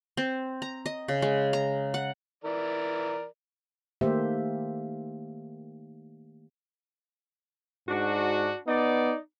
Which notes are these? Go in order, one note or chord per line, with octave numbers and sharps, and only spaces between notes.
C4
A#5
D#5
C#3
G#3
A#5
F#5
E3 A#4 D5
D#3 A3 A#3 G4 C5 E5
G#2 D4 F#4
B3 D#4 D5